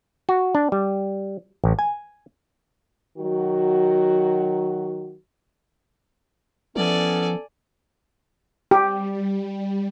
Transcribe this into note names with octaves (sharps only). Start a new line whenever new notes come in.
F#4
D4
G3
A1
G#5
D#3 F#3 F#4
E3 F3 B3 C#4 A4 D5 G#5
G3 G4